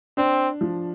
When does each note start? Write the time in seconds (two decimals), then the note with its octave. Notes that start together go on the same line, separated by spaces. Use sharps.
0.17 C4 D4
0.61 F3